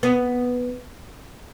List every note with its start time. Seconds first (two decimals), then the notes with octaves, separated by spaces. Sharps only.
0.03 B3